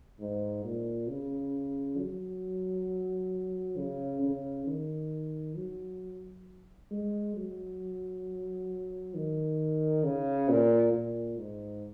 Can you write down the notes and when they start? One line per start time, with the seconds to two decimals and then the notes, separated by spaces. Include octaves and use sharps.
0.20 G#2
0.64 A#2
1.09 C#3
1.98 F#3
3.77 C#3
4.22 C#3
4.67 D#3
5.56 F#3
6.91 G#3
7.36 F#3
9.15 D#3
10.04 C#3
10.49 A#2
10.93 A#2
11.38 G#2